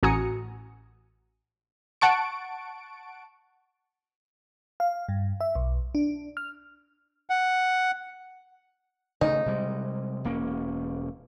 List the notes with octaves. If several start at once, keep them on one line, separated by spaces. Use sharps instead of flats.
A1 F#4 G#5 A#5 D#6 C#7
F#5 A5 C#6 D7
F5
G2
E5
B1
D4
F6
F#5
C#3 A3 D#4
C3 G3 G#3
E1 A#3 C#4